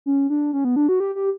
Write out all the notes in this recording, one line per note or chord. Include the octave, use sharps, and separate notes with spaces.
C#4
D4
C#4
B3
D4
F#4
G4
G4